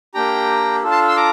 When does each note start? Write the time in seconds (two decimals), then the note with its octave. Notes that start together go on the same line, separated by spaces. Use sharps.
0.14 A#3 D4 G4 G5 A#5
0.83 D4 F4 A4
0.91 A5 C6
1.08 C6 E6
1.17 A#5 D6